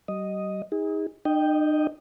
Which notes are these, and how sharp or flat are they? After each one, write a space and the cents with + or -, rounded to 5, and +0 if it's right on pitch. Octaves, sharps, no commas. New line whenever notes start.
G3 -40 D#5 +0
D#4 +30 G#4 -30
D#4 -45 D#5 +0 G5 +0